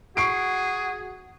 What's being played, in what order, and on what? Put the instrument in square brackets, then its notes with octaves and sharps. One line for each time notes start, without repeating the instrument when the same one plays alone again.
[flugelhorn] F#4 [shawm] G#4 [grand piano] C#6 C7 D7